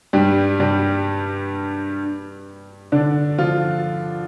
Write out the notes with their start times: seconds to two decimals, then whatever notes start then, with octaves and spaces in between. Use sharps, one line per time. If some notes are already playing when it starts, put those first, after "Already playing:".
0.13 G2 G3
0.60 G2 G3
2.92 D3 D4
3.38 F3 F4